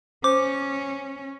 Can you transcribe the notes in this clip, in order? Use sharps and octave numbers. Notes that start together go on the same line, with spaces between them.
C#4 C5 D6